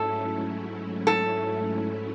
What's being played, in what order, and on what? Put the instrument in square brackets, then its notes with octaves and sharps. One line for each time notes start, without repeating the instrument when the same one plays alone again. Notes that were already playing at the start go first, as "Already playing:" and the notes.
Already playing: [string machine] G#2 F#3 A3 C#4 E4 [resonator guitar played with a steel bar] A4
[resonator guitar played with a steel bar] A4